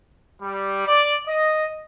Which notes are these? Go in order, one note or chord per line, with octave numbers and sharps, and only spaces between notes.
G3
D5
D#5